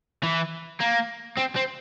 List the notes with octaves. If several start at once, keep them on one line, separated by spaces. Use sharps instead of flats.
E3
A#3
C4
C4